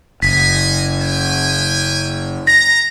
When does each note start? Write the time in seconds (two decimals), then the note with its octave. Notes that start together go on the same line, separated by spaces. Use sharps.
0.22 F#1 D#4 G#5 B6
1.01 E5 G5 G#5
2.47 A#5 A#6